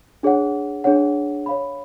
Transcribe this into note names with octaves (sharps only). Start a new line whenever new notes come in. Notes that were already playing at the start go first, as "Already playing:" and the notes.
D4 G#4 C#5 F#5
D4 G#4 C#5 F#5
C#5 F5 B5